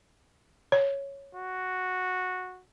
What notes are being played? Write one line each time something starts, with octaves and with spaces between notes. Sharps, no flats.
C#5
F#4